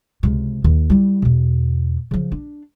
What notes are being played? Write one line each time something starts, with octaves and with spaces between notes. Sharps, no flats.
C#2 C3
D#2
G3 E4
E2 B2
C#3 F3
D4